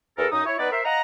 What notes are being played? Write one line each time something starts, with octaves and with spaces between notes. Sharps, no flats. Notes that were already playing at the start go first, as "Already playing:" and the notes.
E2 A4 A#4
F#2 D#4 D#6
E4 C#5
B3 D#4 B4 D5
A#4 C5 E5
D#5 F5 F#5 A#5